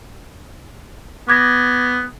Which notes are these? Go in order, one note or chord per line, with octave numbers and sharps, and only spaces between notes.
B3 D6 G#6 A#6